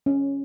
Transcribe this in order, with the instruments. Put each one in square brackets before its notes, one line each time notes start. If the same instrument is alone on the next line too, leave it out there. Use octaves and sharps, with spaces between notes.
[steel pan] C#4